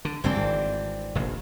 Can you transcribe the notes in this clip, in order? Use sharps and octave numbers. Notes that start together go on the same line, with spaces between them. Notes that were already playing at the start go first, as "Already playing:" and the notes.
D3
F#1 G2 E3 G#3 C4 D4
G#1
F1 A#1